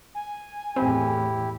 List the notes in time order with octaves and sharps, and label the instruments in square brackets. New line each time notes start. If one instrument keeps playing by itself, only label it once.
[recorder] G#5
[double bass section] E2 A2 [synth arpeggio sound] C4 [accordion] E4 G4